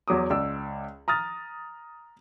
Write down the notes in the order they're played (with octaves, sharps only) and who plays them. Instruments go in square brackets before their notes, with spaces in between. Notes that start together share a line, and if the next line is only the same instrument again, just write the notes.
[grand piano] E2 F#3 D6 D#6
C#2 D5 E6
A#5 D#6 F6 A6